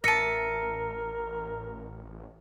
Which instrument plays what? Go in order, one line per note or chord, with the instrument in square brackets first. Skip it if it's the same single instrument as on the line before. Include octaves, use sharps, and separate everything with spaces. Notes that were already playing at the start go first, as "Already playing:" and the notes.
[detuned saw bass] A1 [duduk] A#4 [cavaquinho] E5 A5 [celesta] A#6 C#7 D#7